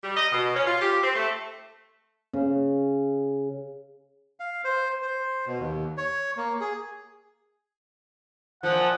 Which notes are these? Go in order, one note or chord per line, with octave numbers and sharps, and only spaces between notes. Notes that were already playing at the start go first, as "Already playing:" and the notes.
G3
D#5
B2
C#4
F4
G4
C4
A3
C#3
F5
C5
C5
B2
D#2
C#5
A#3
G#4
A#2 F3 F#5